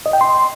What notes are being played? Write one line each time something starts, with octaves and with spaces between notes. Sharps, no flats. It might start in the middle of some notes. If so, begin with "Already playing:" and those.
D#5
G5
C6